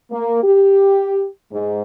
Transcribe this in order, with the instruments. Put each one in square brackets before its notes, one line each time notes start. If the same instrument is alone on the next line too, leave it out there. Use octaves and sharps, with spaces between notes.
[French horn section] A#3
G4
G#2